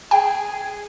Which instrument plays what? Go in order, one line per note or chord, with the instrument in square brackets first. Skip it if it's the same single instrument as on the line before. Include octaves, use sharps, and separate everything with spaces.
[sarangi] G#4 [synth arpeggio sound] G5